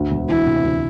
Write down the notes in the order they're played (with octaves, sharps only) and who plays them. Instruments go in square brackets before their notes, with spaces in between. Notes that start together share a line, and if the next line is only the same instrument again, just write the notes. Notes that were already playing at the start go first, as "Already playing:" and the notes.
Already playing: [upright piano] D2
E1
[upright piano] E3 [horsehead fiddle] E4
[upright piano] C3
D2